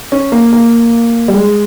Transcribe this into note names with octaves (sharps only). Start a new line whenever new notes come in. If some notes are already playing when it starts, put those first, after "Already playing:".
C#4
A#3
A#3
G3
G#3